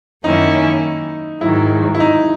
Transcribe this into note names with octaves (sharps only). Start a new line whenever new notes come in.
F#2 D#3 A#3 C#4 D#4 E4
G#2 D#3 F#3 E4
E4
D#4